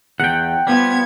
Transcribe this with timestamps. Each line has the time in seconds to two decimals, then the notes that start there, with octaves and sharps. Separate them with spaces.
0.20 E2 F#5 G5
0.67 F3 G3 B3 G#6